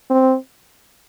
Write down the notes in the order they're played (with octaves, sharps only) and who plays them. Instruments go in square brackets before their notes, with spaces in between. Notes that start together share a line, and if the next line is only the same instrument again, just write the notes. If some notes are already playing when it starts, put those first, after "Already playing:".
[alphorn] C4